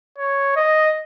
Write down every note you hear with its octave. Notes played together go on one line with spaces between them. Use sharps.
C#5
D#5